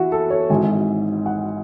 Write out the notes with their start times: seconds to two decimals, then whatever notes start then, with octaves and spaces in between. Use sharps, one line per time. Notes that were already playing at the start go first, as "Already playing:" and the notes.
Already playing: E3 E4 F#4
0.12 A4
0.30 C#5
0.50 G#1 G#2 E3 G#5
1.26 F#5